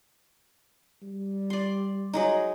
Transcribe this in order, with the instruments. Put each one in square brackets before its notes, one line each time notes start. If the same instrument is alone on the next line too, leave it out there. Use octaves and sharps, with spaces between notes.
[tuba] G3
[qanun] D5 C6
F#3 G#3 D#4